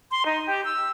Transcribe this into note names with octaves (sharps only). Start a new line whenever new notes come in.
C6
D#4
G4
E6